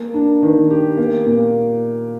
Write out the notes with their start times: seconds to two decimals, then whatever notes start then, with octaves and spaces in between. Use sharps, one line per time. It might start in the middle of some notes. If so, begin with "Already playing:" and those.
Already playing: A#3
0.14 D4
0.43 D#3
0.71 G4
0.98 A#3
1.26 A#2